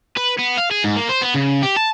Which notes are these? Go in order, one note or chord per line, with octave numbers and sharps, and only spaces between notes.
B4
B3
F5
G#4
G#2
A#3
C5
B3
C#3
G4
A5